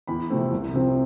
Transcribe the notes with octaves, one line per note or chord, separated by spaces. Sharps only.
E2 B5
C3 F3 A3 C4
C2
C3 F3 C4